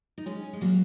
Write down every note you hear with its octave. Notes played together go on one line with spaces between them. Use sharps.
D#4
G#3 C#4
G#3
F#3 A#3